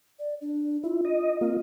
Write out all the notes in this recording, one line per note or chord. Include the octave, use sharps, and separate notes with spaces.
D5
D4
E4 F4
D#5
A#3 C4 F4